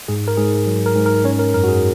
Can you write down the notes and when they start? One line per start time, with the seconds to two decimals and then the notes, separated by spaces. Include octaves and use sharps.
0.08 G#2 G#4
0.28 A#4
0.37 G#2 G#4
0.66 F#3
0.86 A#4
0.95 G#2
1.06 A#4
1.24 C#4 C#5
1.39 A#4
1.54 F#2 A#4
1.64 F#4
1.68 G#4